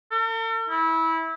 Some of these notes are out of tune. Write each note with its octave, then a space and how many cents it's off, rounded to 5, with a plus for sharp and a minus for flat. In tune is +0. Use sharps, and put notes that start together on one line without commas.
A4 +45
E4 -20